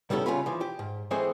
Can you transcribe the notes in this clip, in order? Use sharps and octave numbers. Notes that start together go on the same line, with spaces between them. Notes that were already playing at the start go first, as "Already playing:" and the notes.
C3 G3 B3 C#4 E4 A4
C2 C#3 C#4 F4 B5
E3 F3
G4
G#2
E3 G#3 A3 C4 G#4 C5